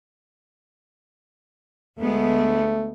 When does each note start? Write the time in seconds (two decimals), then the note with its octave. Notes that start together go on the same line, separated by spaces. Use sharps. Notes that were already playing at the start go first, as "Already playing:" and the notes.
1.99 D2 G#3 A3 B3